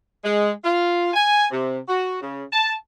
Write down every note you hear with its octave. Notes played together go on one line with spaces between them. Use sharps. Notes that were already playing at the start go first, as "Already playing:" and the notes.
G#3
F4
G#5
C3
F#4
C#3
A5